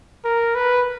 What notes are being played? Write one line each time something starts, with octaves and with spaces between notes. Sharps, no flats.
A#4
B4